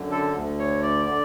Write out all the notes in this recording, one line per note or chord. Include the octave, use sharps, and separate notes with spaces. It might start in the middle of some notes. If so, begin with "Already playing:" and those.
Already playing: F#2 D3
A4
D2 D3
C#5
D5
D3 D5